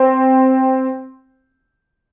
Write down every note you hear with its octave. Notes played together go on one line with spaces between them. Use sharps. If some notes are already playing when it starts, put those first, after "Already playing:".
Already playing: C4